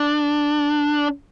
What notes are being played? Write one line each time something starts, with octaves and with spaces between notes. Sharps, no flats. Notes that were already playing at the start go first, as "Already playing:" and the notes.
Already playing: D4